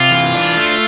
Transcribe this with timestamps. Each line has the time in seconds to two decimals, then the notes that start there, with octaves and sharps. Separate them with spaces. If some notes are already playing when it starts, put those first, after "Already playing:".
Already playing: C3 F4
0.11 E3
0.34 D4
0.57 A3